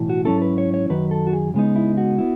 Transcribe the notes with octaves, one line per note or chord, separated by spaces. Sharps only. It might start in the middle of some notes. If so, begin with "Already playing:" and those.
Already playing: B1 A2 E3 A3
F#4
G#2 F#3 C#4 E4 A4
B4
C#5
C#5
F#2 D#3 F#3 B4
A4
F#4
G#4
C#3 G#3 B3 D#4
E4
F#4
B3 E4